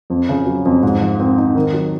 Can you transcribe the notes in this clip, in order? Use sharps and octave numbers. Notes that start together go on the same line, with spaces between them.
F2
C#3
F#3
F2
G#2
F3
C4
D#4
D#3
F#3